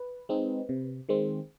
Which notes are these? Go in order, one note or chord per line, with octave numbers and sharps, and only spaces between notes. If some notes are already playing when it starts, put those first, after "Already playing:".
Already playing: B4
G#3 C4 D#4
C3
D#3 G#3 C4